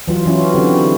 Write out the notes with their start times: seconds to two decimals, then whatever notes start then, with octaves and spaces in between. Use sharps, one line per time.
0.08 E3 F#3 F4
0.26 E3 F#3 C#4 E4 F4
0.53 D3 F#3 C4 E4 F#4 G4